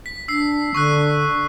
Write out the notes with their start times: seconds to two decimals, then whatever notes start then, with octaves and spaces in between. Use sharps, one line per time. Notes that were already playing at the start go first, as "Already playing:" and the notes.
0.06 B6
0.28 D4 E6 C7
0.75 D3 C#6 E6 F#6